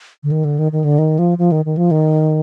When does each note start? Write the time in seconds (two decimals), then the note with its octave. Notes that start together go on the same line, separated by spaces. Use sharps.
0.23 D3
0.31 D#3
0.45 D3
0.59 D#3
0.72 D#3
0.84 D3
0.98 D#3
1.19 F3
1.38 F3
1.52 D#3
1.65 D#3
1.77 F3
1.91 D#3